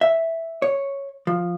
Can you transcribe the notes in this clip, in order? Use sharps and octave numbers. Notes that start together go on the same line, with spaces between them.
E5
C#5
F3